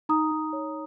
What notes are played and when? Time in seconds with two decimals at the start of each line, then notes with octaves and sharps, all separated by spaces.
0.09 D#4 A#5 D#6
0.31 D#4
0.53 C#5